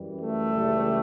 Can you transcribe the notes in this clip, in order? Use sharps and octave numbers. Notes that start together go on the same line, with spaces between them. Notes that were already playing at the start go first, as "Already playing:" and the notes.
Already playing: F#2 E3 G3
A3
C#2 C#3 E3 G3